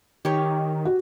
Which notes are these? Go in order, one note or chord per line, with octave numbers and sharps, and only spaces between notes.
D#3 G4 C#5
F#4